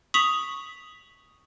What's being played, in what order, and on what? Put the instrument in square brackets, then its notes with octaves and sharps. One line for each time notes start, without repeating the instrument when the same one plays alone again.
[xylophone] C#6 D#6 B6 F7 F#7